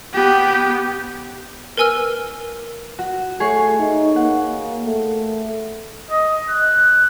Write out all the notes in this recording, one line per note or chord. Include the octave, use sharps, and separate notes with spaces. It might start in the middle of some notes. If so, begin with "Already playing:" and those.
B3 G4
A#4 B4 G#5 E6 F6
F#4
A3 G#4 C#5 C7
D#4
A#3 F#5
A3
D#5
F#6